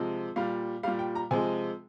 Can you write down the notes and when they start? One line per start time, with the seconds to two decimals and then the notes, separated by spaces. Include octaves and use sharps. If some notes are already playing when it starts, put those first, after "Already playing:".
Already playing: C3 F3 G#3
0.36 A#2 G3 F5
0.83 A#2 G3 F5
0.99 G5
1.15 A#5
1.31 C3 F3 G#3 G#5